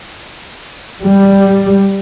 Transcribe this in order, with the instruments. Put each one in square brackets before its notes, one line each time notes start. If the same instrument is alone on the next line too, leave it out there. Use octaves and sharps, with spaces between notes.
[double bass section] G3